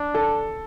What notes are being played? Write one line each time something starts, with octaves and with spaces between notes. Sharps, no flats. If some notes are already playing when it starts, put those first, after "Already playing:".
Already playing: D4
A4